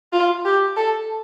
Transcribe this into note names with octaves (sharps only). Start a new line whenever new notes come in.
F4
G4
A4